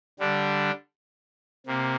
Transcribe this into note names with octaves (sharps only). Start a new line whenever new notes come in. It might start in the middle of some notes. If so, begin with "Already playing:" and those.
D3 G3 D4
C3 A#3